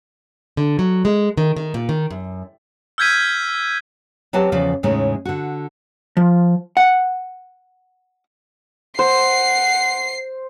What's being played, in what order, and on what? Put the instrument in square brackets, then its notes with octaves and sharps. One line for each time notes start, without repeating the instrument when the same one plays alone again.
[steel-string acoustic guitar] D3
F#3
G#3
D#3
D#3
A#2
D#3
F#2
[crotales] E6 F6 G6 G#6 B6 D#7
[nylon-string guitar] F#3 C4 G4 B4 F#5 A5
E2 C#3 F3 D5 F5
E2 A2 C#3 G#3 D#4
D3 F#4
[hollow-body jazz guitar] F3
F#5
[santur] C5 [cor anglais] F#5 [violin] C7